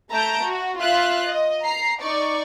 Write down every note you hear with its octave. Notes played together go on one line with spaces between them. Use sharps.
A3 E5 A5 A#5 G6 D7
F#4
F4 E5 F#6
D#5
A#5 C7
D#4 D5 C#6